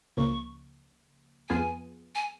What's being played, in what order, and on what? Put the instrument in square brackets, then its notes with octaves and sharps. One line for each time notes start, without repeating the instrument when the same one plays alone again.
[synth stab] C#2 C#3 F3 A#3 [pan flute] C#6
[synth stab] F2 F3 B3 F4 G#4 [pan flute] G#5
[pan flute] G#5